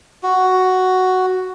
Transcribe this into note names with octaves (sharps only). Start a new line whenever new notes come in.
F#4